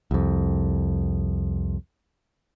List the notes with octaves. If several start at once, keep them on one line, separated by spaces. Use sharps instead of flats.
C2 F2